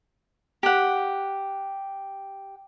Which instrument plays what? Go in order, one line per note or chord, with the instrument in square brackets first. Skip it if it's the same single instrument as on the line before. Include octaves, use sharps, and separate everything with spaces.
[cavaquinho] G4 F#5